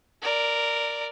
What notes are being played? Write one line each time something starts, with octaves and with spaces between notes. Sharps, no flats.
A#4 D5